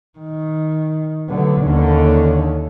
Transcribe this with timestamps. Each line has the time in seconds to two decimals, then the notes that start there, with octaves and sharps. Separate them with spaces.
0.19 D#3
1.29 D3 F#3 G3 A3 B3
1.63 D#2 D3 C#4